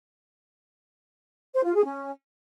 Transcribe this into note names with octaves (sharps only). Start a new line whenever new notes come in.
C5
F4
G#4
C#4